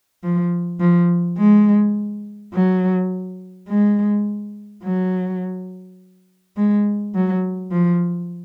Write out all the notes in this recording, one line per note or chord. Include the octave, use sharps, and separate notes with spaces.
F3
F3
G#3
F#3
G#3
F#3
G#3
F#3
F3